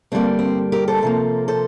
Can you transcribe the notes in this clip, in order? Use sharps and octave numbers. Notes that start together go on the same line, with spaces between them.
G2 D3 G3 A#3 C4
C4
G4 A#4
A4 C5
C3 F3 A#3
A4 C5